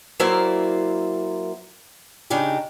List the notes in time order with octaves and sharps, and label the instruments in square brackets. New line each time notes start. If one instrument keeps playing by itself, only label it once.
[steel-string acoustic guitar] F#3 A#3 E4 A#4 C5 D5
C#3 D4 D#4 G4